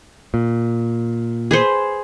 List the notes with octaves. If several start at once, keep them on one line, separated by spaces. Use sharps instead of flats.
A#2
G#4 B4 C5